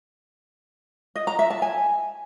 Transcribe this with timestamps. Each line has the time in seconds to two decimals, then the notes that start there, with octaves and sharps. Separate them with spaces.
1.16 D#5
1.27 A#5
1.39 E5
1.50 A5
1.62 G#5